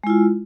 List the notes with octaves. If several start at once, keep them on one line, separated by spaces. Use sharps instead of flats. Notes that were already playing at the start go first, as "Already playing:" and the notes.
G#3 E4 F4